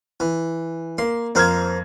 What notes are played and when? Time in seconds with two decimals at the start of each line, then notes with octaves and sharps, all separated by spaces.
0.20 E3
0.98 A#3 C6
1.35 F2 A#3 C5 F5 G#6